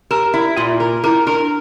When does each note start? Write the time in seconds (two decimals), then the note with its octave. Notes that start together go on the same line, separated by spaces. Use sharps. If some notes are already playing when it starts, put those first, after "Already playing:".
0.11 G4 A#4
0.34 E4
0.57 A#2 F4
0.80 A#4
1.04 E4 A#4
1.27 D4 A#4